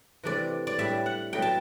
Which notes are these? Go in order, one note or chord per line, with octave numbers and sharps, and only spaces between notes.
C3 E3 A3 D4 D5
D5
A2 G3 D4 E5
F#5
B2 F#3 A3 D4 G5
A5